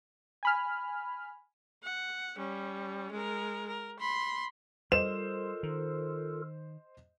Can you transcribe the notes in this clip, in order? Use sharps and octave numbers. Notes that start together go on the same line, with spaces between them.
G#5 B5 F6
F#5
G3 C#4
G#3 A#4
A#4
B5 C6
G3 F4 A4 A#4 C5 D#5 E7
D#3